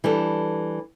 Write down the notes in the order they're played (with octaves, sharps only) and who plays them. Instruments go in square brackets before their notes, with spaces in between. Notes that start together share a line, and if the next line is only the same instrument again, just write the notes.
[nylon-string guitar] E3 G3 D4 A4